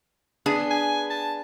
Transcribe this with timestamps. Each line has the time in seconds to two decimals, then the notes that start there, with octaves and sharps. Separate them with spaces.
0.46 B3 D4 G#4
0.71 G#5
1.10 A5